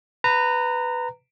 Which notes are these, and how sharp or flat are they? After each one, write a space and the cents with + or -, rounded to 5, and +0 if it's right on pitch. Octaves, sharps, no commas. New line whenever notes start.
B4 +10 A#5 -20